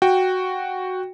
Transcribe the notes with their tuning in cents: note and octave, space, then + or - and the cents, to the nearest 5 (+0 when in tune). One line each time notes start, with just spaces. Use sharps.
F#4 +0 G5 +0